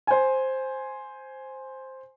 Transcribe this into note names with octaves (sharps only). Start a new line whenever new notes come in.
C5 G#5